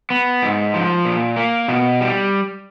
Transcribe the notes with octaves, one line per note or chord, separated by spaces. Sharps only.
B3
G#2
F3
A#2
A#3
B2
G3